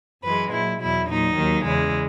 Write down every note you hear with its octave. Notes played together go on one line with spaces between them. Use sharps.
F#2 E3 G#3 B4
A#2 F#3 E4
E2 B2 F#3 E4
A#2 F#3 D#4
D#2 D#3 F#3
E2 C#3 E3 G#3